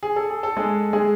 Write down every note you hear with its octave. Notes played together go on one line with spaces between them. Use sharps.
G#4
A4
G#4
A4
G#3 G#4
G#3 G#4